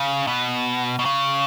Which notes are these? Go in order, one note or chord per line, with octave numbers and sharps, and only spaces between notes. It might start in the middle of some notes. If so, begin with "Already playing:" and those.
Already playing: C#3
B2
B2
C#3